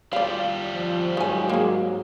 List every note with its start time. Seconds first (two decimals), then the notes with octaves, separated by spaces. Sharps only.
0.13 G3 F4 D5 F5
0.73 F3
1.17 G#2 D#3 F#3 G#5
1.49 A#3 G#4